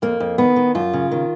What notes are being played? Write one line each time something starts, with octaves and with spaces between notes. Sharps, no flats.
F2 A#3
F2
D#3 B3
D#3
F#2 F4
C#3
D#3